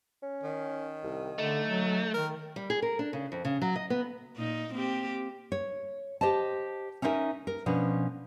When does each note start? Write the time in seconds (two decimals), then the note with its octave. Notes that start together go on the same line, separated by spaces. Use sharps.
0.23 C#4
0.43 D#3
1.03 C2
1.38 D3 A3 D#4
1.67 F#3
2.14 D#3 A#4
2.56 G3
2.70 G#4
2.82 A#4
2.99 D4
3.13 C#3
3.32 F2
3.45 C#3
3.62 F#3
3.76 D#5
3.90 B3
4.36 A#2 D#4
4.72 A#3 C4 G4
5.52 C#5
6.21 G4 C5 D#5 A5
7.02 C#4 D#4 E4 A#4 E5 G#5
7.47 A#4
7.66 B2 F3 C#4 D4